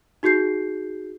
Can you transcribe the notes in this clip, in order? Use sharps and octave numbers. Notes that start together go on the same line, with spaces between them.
D#4 F#4 G#4 G6 C7